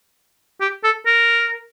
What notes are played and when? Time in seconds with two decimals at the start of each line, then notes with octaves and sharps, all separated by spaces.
0.61 G4
0.84 A4
1.06 A#4